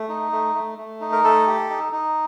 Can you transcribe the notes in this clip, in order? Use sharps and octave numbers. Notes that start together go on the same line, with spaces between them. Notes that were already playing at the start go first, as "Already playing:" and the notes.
Already playing: A3
D#4
A3
A3
A3
D#4
A#4
A3 A4
G4
D#4
D#4